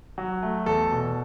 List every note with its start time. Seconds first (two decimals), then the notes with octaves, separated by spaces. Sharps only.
0.18 F#3
0.43 A3
0.66 E2 A4
0.91 B2